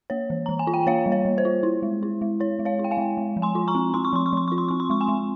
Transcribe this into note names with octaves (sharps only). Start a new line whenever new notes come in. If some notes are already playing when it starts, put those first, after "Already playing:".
A#3 C#5
E3
E3 A#5
G#5
F4
G5
A#3 C#5 F5
G3
C#5
G3
C5
F4
E4
G#3
E4
G#3
E4 C#5
G#3
C#5 F5
E4
G5
F5 G#5
G#3
G#3
F3
G#5 C6
F4
A#5 C#6
C4
C4 C6
C#6
F3 C6
C#6
F3 C6
F4 C#6
C6
C4 C#6
C6
G#3 C#6
G#5 C6
G#3